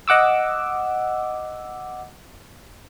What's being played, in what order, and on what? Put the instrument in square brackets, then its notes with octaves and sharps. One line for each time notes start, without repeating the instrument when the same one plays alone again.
[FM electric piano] D#5 F#5 D6 E6